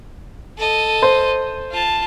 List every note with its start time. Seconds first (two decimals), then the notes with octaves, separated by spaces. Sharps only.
0.58 A4 D#5
1.03 C5
1.71 F4 A5